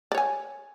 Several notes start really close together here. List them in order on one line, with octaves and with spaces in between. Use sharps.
D5 C#5 G#5